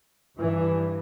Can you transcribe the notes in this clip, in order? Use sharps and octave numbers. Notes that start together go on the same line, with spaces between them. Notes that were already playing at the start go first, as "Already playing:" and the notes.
G2 E3